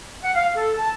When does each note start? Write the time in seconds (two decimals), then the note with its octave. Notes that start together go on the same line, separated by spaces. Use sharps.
0.23 F#5
0.37 F5
0.55 A4
0.77 A5